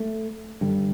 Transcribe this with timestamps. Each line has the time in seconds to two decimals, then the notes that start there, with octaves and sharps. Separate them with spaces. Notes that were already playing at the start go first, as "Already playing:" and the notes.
Already playing: A3
0.61 G2 D3